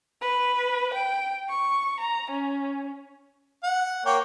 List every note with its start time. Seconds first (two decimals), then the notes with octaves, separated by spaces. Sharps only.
0.22 B4
0.94 G5
1.49 C#6
2.01 A#5
2.31 C#4
3.63 F#5
4.06 A#3 C#5 G5